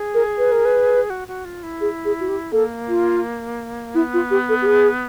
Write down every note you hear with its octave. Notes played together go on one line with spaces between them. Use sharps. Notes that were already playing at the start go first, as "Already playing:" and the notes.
Already playing: G#4
A#4
B4
A#4
B4
F#4
F#4
F4
E4
G#4
G#4
F#4
G4
A#3 A4
F4
B3 E4
F4
G4
A4
G4
G#4